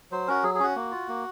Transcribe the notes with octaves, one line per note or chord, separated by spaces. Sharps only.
F#3 C5
C#4 F#4 A#4
F#3 G#4
G#4
C#4 F#4
A#3
F4
A#3